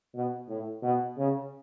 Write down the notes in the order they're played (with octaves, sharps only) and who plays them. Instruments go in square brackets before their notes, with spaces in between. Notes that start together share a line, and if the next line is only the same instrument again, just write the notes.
[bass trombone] B2
A2
B2
C#3